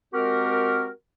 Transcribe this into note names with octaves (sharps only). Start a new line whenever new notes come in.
G#3 C4 F#4 G4 A#4